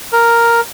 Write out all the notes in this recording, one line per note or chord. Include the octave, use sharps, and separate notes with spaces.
A#4